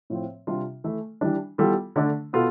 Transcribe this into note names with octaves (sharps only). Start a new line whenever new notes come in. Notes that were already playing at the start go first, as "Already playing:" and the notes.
A2 F3 C4
C3 G3 D4 F4
E3 A3 E4 A4
E3 G3 D4
E3 G3 B3 F4 A4
D3 A3 D4
B2 B3 F4 A4